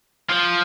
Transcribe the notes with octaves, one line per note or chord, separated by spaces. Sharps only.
F3